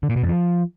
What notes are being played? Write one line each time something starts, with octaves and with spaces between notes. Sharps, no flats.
D3
A#2
B2
F2
F3